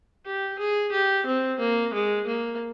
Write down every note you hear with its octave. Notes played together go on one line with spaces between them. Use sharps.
G4
G#4
G4
C4
A#3
G#3
A#3